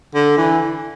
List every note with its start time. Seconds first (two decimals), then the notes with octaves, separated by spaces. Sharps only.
0.15 D3
0.37 E3